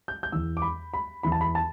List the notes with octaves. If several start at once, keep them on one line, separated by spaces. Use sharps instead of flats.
G6
G6
E2 E3 E6
D6
B5
B5
E2 E3 B5
A5
B5
A5